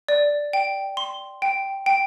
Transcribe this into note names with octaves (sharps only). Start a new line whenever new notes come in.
D5
G5
C6
G5
G5